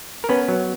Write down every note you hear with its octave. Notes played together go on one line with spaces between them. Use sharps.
A#4
B3 C#4 B4
F#3